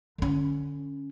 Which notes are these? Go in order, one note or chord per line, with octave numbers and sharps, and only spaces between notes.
D3 C#4